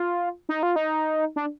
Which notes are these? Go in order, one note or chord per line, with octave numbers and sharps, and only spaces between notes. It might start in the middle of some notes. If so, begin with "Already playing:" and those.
Already playing: F4
D#4
F4
D#4
D4